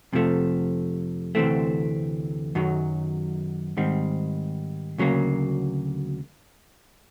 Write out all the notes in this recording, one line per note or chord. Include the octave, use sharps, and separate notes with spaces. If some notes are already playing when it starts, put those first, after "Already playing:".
F2 C3 F3 A3
D2 C3 E3 A3 C4
F#2 D#3 F#3
G#2 D#3 G3 C4
D2 C#3 F#3 A#3